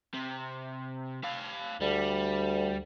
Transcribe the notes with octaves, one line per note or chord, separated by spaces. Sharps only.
C3
G4 F5
D2 G3